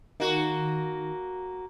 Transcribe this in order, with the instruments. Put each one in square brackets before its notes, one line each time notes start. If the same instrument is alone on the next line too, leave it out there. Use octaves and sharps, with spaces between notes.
[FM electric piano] D#3 [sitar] A#3 F#4